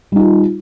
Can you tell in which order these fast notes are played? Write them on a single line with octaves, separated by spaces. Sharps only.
G3 D#4 F4